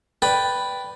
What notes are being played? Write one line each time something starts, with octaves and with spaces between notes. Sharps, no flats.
B4 D5 G5